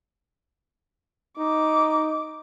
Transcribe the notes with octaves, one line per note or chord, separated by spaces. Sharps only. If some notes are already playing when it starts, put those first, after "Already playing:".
D#4 D6